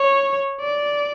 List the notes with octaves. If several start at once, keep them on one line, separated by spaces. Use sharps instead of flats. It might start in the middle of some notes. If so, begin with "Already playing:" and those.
Already playing: C#5
D5